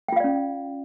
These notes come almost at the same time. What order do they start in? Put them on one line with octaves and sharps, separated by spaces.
G5 F4 F5 D5 C#4